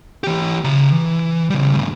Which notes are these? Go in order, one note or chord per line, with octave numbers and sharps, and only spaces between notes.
E3 G4
C#3 A#5
E3
C#3 G3
D2 G2